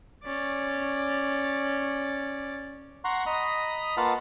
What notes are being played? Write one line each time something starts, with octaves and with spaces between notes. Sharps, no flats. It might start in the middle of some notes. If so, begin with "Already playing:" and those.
C#4 D5
F#5 A#5 C6 C#6
D#5 A#5 B5 D#6
A#3 F4 B4 F5 F#5 A5